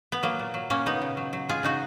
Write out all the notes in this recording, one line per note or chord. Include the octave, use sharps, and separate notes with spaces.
B3
F#3 A#3
A#2
F#3
A#2 A#3 C#4
C#3 B3 D#4
C#3
F#3
F#3
G#3 F4 G#4
C#3 D#4 F#4